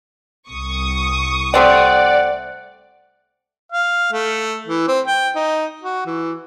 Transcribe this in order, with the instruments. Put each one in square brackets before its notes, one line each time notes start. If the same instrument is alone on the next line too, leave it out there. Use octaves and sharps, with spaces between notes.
[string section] C2 C#6 D#6
[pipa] A3 C4 G4 [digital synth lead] D5 [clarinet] F#5
[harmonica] F5
A3
E3
C4
G5
D#4
F#4
E3